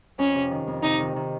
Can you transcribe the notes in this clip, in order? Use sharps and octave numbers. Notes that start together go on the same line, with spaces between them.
F2 C#4
C3
D#3
F2
C3 D#4
D#3
D#3